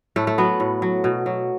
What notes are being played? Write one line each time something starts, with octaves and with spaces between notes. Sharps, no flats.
A2 A3
A3
F#3 B3
A2
F#3
B2
F#3